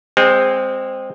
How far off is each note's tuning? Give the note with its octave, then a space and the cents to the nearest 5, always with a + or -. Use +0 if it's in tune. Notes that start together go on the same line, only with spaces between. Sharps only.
G#3 -25 C4 +0